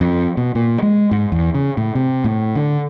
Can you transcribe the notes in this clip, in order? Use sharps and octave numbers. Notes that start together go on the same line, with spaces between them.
F2
B2
A#2
G#3
G#2
E2
C#3
A2
C3
A2
D3